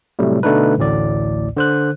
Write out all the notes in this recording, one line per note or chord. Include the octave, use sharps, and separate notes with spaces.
A2 C3 F#3 G3 A3
B2 D3 A3 D4 D#4 B4
A1 D2 A2 D5
D3 C5 F#6